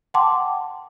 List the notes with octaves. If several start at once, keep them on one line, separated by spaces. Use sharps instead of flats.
F#5 G5 A5 C6 D6